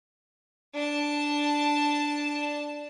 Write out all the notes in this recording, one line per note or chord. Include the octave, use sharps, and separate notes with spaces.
D4 A5